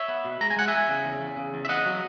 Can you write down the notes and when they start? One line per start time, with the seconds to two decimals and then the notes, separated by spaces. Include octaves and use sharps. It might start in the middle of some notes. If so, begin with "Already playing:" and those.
Already playing: C#5 E5
0.08 B3
0.25 B2
0.41 G#3 A#5
0.50 G#5
0.57 G#3 F#5
0.68 E5 G#5
0.74 E2
0.89 C#3
1.05 E2
1.21 E2
1.37 C#3
1.54 E2
1.65 E5
1.69 B3 D#5 F#5
1.86 F#3